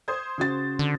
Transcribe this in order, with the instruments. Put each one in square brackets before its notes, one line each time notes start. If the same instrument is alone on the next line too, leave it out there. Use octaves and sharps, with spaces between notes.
[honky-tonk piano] C5 D#6 G#6
[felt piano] C#3 F#4 A6
[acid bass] D3